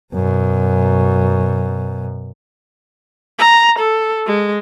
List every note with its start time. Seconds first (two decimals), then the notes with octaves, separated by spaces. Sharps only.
0.14 F#2 B2
3.39 A#5
3.79 A4
4.27 G#3